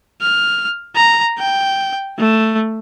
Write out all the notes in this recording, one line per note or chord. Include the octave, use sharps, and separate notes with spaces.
F6
A#5
G5
A3